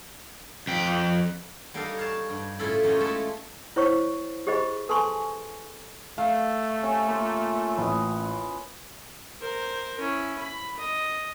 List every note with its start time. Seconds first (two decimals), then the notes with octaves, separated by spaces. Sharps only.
0.67 F2 G5
1.74 G3 A#3 D4 D#4 A4 F5
1.97 C#5 F5 A5
2.30 G2
2.59 A2 C#3 E4 F4 A4 B5
2.83 F#2 A#3 C#4 D#4 F4
3.00 G#3 A3 E4 F4 A5 B5
3.76 E4 C5 C#5 C#6
4.47 G4 G#4 C5 D#5 B5
4.89 A4 B4 G#5 A5 C6 C#6
6.18 A3 F5
6.83 C3 C#4
7.07 A#3 F4
7.78 A1 B4 D#5
9.40 A#4 C5
9.99 C#4 E4
10.39 B5
10.78 D#5